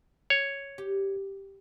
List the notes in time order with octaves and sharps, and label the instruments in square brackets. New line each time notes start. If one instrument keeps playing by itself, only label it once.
[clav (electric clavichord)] C#5
[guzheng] G4